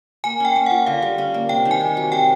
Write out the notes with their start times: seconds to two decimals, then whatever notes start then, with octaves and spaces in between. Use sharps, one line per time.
0.24 A#3 G#5
0.40 C#4 G5
0.56 A#3
0.66 F4 F#5
0.86 D3 F5
1.02 G3
1.18 C#4
1.34 A#3
1.49 C3 G5
1.65 D#3
1.71 G#5
1.80 C3
1.97 F#3
2.12 C3 G5